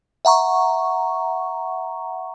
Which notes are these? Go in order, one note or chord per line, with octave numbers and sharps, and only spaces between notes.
E5 F#5 A#5 C#6